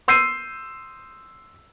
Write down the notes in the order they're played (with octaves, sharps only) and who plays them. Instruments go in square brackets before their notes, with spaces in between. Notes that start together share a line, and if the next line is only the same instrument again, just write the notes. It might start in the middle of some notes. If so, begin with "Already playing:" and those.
[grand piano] C6 E6 G6 C7 D#7